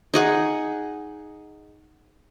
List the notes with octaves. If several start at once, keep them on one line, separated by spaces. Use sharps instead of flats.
D#4 G#4 F#5